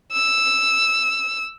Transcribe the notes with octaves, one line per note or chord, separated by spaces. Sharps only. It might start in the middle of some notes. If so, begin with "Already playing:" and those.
E6